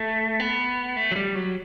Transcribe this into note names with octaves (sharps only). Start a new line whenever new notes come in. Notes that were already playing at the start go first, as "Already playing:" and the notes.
Already playing: A3
B3
A3
F#3
G3
F#3